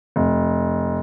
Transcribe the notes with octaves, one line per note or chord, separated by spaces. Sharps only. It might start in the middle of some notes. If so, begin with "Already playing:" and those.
F1